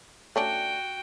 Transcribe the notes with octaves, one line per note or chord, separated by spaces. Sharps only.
A3 C#4 D4 F#4 G5